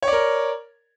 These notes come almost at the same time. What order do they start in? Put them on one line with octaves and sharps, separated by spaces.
C#5 D5 A#4